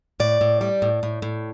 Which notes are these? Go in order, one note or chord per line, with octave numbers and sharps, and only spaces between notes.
A2 D5
A2
G3
A2
A2
A2